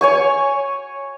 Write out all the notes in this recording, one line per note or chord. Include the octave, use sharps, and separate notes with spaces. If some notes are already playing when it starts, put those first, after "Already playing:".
C#5 G#5 C#6